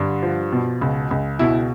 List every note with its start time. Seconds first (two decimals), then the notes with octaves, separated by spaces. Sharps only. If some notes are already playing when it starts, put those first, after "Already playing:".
Already playing: G2 D3
0.23 F3
0.52 B2
0.81 C#2
1.11 C#2
1.39 B2 E4